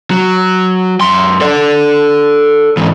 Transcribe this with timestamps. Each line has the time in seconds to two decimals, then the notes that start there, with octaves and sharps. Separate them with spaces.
0.11 F#3
1.01 F#2 C6
1.41 A4 D5
2.77 G#2 E3